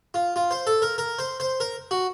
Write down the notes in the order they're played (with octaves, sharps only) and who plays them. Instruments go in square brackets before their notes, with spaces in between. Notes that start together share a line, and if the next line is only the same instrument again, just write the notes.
[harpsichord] F4
F4
C5
A4
A#4
A#4
C5
C5
A#4
F#4